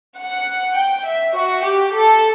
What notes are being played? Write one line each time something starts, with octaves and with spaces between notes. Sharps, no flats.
F#5
G5
E5
F#4
G4
A4